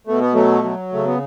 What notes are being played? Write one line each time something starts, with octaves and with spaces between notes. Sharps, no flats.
B2 A3
B3
F#3 A3
F#3
C#3 A3
B3